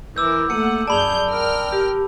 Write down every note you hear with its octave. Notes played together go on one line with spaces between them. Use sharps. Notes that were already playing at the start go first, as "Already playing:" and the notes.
E3 A#4 D6 E6 G6
A3 A#3 F#5 C#7 D#7
F#2 G#4 D5 A5 B5 G6 F7
A#4 G5 F6
G4